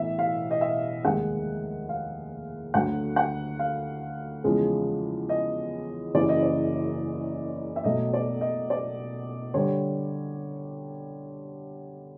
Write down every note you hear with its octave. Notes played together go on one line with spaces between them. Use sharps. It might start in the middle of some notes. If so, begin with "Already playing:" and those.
Already playing: B1 A2 E3 E5
F5
D#5
E5
F1 D#2 D#3 G#3 F#5
F5
D2 D3 F#3 F#5
F#5
F5
E2 C#3 F3 G#3
D#5
F#1 F#2 C#3 E3 D5
D#5
D5
E5
B1 B2 F#3 A3 D#5
D5
D#5
D5
D3 G3 C#5